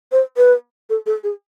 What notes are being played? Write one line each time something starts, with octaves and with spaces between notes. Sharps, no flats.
C5
B4
A4
A4
G#4